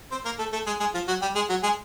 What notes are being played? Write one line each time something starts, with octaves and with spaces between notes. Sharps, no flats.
C4 C5
A#3 A#4
A3 A4
A3 A4
G#3 G#4
G#3 G#4
F3 F4
F#3 F#4
G3 G4
G#3 G#4
F#3 F#4
G#3 G#4